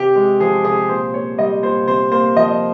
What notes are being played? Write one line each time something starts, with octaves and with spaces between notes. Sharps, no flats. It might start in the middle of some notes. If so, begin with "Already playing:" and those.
Already playing: C3 G4
G#3
F3 G#4
C3 G#4
A#2 C5
A#3 C#5
G3 D#5
A#2 C5
C3 C5
A#3 C5
F3 D#5